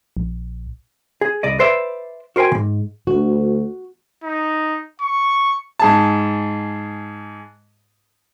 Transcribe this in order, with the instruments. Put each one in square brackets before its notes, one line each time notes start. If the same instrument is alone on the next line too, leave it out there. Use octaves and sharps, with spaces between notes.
[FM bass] A#1
[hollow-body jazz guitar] G#4
C2 D5 D#5
B4 C5 D5 E5
F#4 A#4 C5 G5 G#5
G#2 C#3
[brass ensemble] D2 [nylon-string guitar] F#4
[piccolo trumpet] D#4
C#6
[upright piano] G#2 G#4 A5